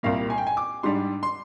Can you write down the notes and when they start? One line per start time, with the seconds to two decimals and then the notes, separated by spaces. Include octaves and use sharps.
0.03 C2 A#2 G3 A#3 F5
0.30 G#5
0.38 G5
0.47 G#5
0.57 D6
0.83 G#2 G3 D4 C6
1.23 C6